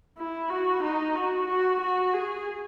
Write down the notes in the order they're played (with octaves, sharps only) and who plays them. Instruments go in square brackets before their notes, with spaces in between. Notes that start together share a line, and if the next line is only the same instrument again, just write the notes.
[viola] E4
F#4
D#4
F#4
F#4
F#4
G#4